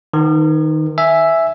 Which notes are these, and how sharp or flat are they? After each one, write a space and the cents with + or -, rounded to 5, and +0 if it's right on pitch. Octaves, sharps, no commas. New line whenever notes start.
D#3 +0 B4 +35
E5 +0 G#5 +0